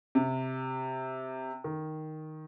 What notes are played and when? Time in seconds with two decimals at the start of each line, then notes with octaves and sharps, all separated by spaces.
0.15 C3
1.64 D#3